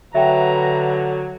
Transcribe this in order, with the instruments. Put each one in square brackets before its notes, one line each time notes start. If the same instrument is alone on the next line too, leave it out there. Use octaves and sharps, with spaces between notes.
[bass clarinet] D3 [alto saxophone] F#3 [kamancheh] B4 A#5 [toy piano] E5 G5